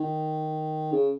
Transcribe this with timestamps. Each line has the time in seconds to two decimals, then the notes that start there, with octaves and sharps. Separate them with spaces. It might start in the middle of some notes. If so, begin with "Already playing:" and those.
Already playing: D#3
0.93 C#3